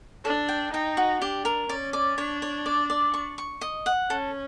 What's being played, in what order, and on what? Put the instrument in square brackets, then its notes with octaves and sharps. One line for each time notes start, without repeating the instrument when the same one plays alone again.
[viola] D4 [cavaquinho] A4
[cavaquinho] G5
[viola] D#4 [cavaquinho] G5
[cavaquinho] F#4
[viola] D4 [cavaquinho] G4
[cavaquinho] A#4
[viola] C#4 [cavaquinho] D5
[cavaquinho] D5
[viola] D4 [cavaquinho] C#5
[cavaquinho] C#5
D5
D5
C#6
C#6
D#5
F#5
[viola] C#4 [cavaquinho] A4